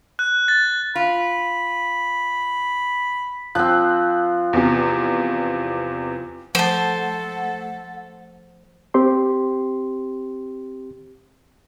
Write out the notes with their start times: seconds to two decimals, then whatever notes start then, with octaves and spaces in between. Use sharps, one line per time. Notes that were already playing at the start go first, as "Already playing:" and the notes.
0.19 F#6
0.48 A6
0.95 F4 B5
3.55 F3 C4 F#6
4.53 E2 C3
6.55 F3 A3 A4 C5 F#5 A5
8.94 C4 G4 C6